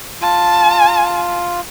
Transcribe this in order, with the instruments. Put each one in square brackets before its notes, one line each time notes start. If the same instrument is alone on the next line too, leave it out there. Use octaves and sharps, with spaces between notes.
[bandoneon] F4 [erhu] A5